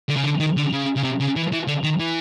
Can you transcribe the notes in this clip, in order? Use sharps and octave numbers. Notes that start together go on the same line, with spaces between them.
D3
C#3
D3
D#3
D3
C#3
C#3
C3
C#3
E3
E3
D3
D#3
E3